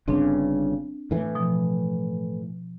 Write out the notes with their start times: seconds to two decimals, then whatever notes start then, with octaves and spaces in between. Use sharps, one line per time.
0.08 G1 G2 C#3 C4 D4
1.11 A2 E3
1.35 B2 F3